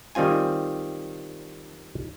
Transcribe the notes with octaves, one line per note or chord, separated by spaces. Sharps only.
D#3 G3 C4 F4 G#5